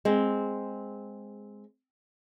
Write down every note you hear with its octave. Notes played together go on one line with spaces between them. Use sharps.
G#3 C4